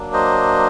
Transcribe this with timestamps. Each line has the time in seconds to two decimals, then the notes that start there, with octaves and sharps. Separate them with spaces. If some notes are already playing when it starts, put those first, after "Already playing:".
Already playing: F#3 A#3 D4
0.13 C5 D#5